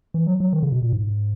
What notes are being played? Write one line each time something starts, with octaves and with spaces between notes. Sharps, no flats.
E3
F#3
F#3
D#3
C#3
B2
A#2
G#2